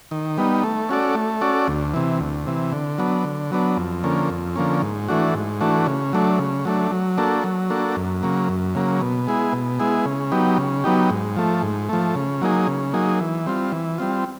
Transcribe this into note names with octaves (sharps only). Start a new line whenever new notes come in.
D#3
G3 B3 D#4
A3
C#4 F#4 A4 D5
A3
C#4 F#4 A4 D5
D2
C3 E3
D2
C3 E3
D3
F#3 B3 D4
D3
F#3 B3 D4
F2
D3 F3 A#3 C#4
F2
D3 F3 A#3 C#4
G#2
E3 A3 D4 F#4
G#2
E3 A3 D4 F#4
C#3
F#3 A3 D4
C#3
F#3 A3 D4
F#3
A#3 D4 F#4 A4
F#3
A#3 D4 F#4 A4
F#2
C#3 F#3 A#3
F#2
C#3 F#3 A#3
B2
G#3 B3 E4 G#4
B2
G#3 B3 E4 G#4
C#3
F#3 B3 D#4 G4
C#3
F#3 B3 D#4 G4
G#2
F3 A3
G#2
F3 A3
C#3
F#3 A#3 D#4 G#4
C#3
F#3 A#3 D#4 G#4
E3
G3 C4 F4
E3
G3 C4 F4